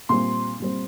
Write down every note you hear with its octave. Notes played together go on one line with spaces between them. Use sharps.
A#2 G3 C4 C6
A#2 G3 C4